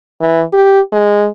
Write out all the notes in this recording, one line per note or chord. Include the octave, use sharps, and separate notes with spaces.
E3
G4
G#3